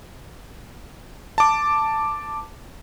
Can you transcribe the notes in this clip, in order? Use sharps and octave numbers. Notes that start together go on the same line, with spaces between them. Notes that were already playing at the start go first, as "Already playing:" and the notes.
A5 D6